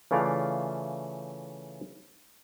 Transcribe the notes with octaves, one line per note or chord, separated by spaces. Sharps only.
C#3 E3 A3 F4 D5 F5